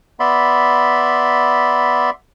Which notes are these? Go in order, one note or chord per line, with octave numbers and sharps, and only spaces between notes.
B3 D5 E5 B5 C6